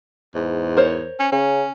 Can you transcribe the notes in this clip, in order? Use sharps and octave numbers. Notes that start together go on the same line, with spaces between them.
E2 G#2
A#4 C5 C#5
C#4
C#3 C#4